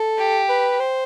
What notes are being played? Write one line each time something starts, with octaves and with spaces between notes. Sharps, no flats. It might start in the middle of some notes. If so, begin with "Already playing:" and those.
Already playing: A4
G4
B4
C5